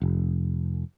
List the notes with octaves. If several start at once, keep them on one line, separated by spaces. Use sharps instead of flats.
F1